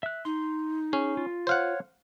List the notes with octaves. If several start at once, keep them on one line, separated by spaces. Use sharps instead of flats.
E5 F#6
D#4 C6
C#4 G#4
F4
C5 C#5 F5 F#5